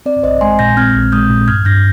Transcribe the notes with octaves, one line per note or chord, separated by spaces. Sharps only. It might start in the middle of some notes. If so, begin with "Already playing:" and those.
C4 D5
A#1 C5 D#5
G#3 G#5 C6
A#2 G6 A#6
C4 F6 G#6
A#1
G#3 D#6 G6
A#2
G2 F6 G#6
G2 G6 A#6